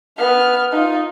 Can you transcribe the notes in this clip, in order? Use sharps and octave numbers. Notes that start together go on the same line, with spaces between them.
B3 F6
D#4 F4